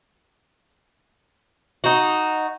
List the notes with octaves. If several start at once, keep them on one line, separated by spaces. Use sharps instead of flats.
D#4 F#4